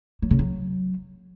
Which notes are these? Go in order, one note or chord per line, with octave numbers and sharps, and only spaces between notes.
F#3
C#3
F#3